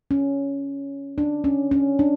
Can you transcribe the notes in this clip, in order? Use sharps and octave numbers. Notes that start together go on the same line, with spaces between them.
C#4
D4
C#4
C#4
D4